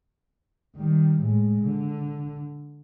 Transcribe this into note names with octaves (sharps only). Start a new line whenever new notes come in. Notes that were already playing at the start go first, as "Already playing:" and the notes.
D#3 G3
A2 G#3
D3